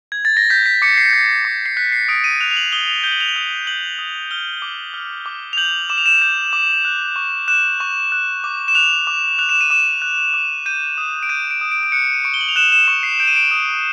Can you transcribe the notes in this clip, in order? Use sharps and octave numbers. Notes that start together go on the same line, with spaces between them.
G#6
A6
A#6
G6 B6
B6
D6 C#7
C7
C#7
G6 C7
D6
C7
F#6 B6
C7
D#6 D7
D#7
F#6 F7
F7
F#7
D#6 G7
F7
G6 G7
F#7
F7
F#7
D#6
G6 F#7
D#6
F6 G7
D6
F6
D6
F7
G6 F#7
D6 E7
F7
E7
G6
D6
F#6
C#6
F#6 E7
C#6
F#6
D6
E7
F#6 F7
D6
F#6 F7
E7
D#7
D6 E7
F#6
D6
G6 D#7
D#6
D7
G6 D#7
D7
D#6
D7
D7
F#6 C#7
D#7
C#6 D7
G7
F#7
F7
F#6 E7
E7
C#6 C#7
C7
G6 D7
D#7
D7
D#6